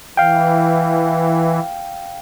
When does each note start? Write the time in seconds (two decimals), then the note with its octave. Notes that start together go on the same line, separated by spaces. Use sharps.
0.17 E3 F5 G5